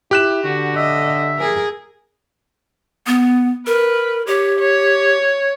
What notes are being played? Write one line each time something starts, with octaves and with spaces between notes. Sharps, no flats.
E4 G4 F#6 E7
D3 F#4
D#5 E5
G#4 A#4
B3
A#4 B4
G4 C#5
C#5